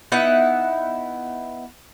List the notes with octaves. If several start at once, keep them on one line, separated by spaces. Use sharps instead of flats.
B3 D#4 E4 F#5